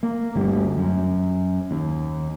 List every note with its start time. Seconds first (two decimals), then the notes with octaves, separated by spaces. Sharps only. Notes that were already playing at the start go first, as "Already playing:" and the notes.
0.03 A#3
0.35 G1 D2 G3
0.77 F#2
1.71 D#2